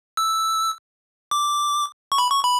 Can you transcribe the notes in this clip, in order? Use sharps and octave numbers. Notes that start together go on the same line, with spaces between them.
E6
D6
C#6
B5
C#6
B5